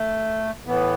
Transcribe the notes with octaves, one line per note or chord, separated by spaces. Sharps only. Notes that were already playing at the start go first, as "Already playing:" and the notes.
Already playing: A3
A2 E3 B3